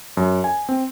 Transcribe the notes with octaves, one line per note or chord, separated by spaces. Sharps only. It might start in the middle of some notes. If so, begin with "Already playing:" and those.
F#2
G#5
C4